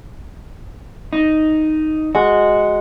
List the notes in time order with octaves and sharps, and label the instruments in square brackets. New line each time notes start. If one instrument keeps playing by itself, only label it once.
[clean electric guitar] D#4
[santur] G#3 [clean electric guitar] F#4